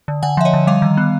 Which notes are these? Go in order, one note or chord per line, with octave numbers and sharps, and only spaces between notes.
D3
D3 F#5 G#5
F3 E5
C#5 D#5
D3
G3 D#5 F5
D#3
B3